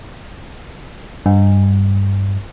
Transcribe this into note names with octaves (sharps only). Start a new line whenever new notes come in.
G2